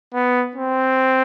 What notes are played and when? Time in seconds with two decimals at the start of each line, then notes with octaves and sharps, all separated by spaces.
0.14 B3
0.56 C4